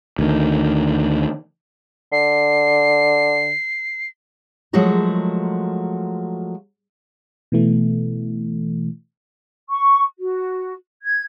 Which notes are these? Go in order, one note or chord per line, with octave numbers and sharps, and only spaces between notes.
D2 D#3
D3 C7
F3 F#3 G#3 A3 F#4 A#4
B2 E3 A3
C#6
F#4
G#6